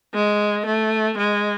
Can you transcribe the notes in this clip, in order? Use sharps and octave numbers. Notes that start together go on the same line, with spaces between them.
G#3
A3
G#3